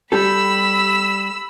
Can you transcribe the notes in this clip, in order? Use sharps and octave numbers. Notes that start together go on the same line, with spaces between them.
G3 G4 A4 B5 E6